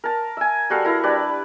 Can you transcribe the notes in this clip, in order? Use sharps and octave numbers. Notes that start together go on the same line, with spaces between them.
A#4 A5
E5 G#5
G3 F#4 A4 F5
E4 A#4
G3 D4 B4 D5